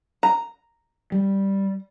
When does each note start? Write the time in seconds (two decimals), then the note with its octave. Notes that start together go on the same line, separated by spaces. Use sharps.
0.23 A#5
1.12 G3